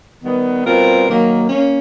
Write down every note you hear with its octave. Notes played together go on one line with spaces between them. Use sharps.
D#3 G3 B3
B2 G3 C4 F4 A#4
D#3 F#3 A#3
A#3 C#4